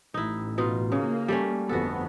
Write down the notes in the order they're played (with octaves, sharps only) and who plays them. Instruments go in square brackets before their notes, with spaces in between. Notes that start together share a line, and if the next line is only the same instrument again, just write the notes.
[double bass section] A1 [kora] D#4 E4
[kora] B2 D#4 F4
[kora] C#3 [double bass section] A#3
[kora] G3 A3 C#4
[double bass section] G1 F2 B3 [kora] F#4 A4